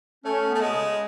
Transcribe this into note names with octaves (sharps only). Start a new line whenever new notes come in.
A3 C#4
B3
A3
B2 G#3
C#3